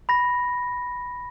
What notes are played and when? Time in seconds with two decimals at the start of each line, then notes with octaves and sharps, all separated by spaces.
0.09 B5 A#6